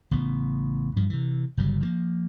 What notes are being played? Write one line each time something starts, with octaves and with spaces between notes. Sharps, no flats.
A1 C#3 B3
G2 F3
C3 E3
G1 C#3 F#3 G3
F3 F#3 A#3